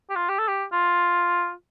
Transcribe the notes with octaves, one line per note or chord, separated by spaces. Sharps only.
G4
F4
G4
A4
G4
F4